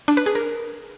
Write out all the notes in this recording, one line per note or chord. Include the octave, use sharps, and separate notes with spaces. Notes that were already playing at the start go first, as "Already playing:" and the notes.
D4
B4
G#4
A#4